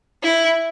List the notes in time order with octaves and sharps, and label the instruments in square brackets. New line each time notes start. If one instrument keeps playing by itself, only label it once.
[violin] E4